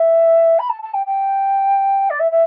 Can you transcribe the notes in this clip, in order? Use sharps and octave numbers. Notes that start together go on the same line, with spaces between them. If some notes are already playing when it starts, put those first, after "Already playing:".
Already playing: E5
B5
A5
A5
G5
G5
D5
E5
E5